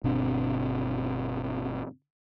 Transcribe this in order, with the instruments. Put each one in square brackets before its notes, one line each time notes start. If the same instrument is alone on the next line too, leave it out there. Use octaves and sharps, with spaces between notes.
[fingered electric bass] G1 B2 C4 D4